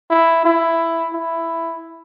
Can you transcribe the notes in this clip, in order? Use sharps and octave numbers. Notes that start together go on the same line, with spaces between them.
E4
E4
E4